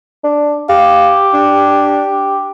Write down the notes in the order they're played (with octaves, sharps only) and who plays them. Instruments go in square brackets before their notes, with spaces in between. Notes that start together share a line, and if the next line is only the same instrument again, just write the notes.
[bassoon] D4
[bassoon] G4 [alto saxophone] F5
[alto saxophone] D4